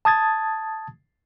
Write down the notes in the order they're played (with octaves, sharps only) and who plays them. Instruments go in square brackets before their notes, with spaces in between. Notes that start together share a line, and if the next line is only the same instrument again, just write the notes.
[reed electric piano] A5 D#6 G#6 A6